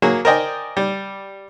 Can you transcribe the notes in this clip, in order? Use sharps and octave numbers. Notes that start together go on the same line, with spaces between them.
F#3 A#3 G#4
A#4 C5 D5 D#5 G5 G#5
G3